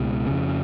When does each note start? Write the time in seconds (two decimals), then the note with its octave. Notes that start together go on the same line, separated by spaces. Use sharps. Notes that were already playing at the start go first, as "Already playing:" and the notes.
Already playing: C#2 B2
0.26 F2 C#3